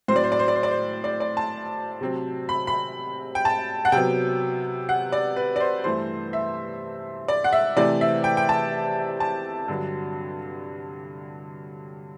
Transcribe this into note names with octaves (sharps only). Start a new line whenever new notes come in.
A2 F#3 C4 C5
D5
C5
D5
C5
D5
C5
D5
C5
D5
D5
A5
C3 F#3 C4
B5
B5
G5
A5
F#5
C3 F#3 B3 G5
F#5
D5
B4
D5
C5
G2 E3 A3 C5
E5
D5
F#5
E5
C3 E3 A3 C4 D5
E5
G5
G5
A5
A5
G2 D3 F#3